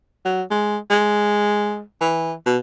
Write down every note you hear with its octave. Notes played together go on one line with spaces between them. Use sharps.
F#3
G#3
G#3
E3
B2